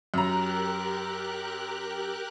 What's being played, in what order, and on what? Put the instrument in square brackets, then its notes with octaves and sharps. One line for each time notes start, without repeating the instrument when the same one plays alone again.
[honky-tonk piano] F#2 A#5 [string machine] G4 A#4 F#6